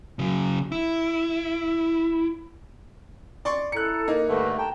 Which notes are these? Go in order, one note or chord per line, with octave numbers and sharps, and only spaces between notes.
C#3 F#3
E4
D5 C6 C#6
E4 A4 A#5 F#6 C#7
A#3 D#4
G2 D3 A3 B4 E5
G5 A5 A#5